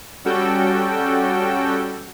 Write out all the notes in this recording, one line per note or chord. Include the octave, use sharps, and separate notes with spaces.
G3 C#4 F#4 A4 G5